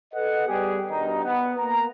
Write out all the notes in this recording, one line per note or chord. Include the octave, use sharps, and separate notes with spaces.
A4 B4 D#5 F#5
G3 B3 G4 G#4
G2 B2 D#3 D#4
B3
A#3 A#4 A#5